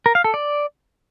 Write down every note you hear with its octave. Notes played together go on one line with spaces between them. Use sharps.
A#4
F5
A4
D5